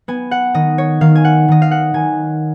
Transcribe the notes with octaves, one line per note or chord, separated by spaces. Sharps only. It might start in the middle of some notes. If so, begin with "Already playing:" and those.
B3 G#5
F#5
D#3 D#5
C#5
D#3 F5
G#5
F#5
D#3 D#5
F5
F#5
D#3 G#5